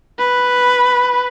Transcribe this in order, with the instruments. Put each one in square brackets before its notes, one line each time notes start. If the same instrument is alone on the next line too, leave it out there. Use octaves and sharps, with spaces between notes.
[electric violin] B4